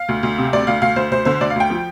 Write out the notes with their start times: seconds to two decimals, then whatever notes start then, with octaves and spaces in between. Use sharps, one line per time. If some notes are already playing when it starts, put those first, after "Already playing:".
Already playing: F5
0.09 D2
0.23 D2
0.38 C3
0.53 D2 D5
0.67 D2 F5
0.82 D2 F5
0.96 D2 C5
1.11 D2 C5
1.25 D3 C5
1.40 D2 D5
1.50 F5
1.55 D2 G5
1.70 F3